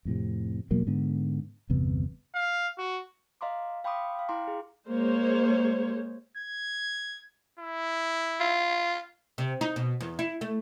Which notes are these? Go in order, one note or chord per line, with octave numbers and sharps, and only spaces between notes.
F2 A2 C3
E1 B2 F#3 A#3
G#2 D3 B3
G1 E2 C3 B3
F5
F#4
D#5 F5 A#5 C6 D6
F5 G5 B5 C6 D6 D#6
F5 G5
E4 G5 A#5 C6 D6
G#4
G#3 A#3 C5 C#5
G#6
E4
F4
C3
D#4
B2
E2
E4
A3